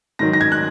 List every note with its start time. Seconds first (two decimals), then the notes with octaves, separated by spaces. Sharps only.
0.19 G#2 D#3 F#3 A#6
0.33 A#6
0.41 G#6
0.52 F#6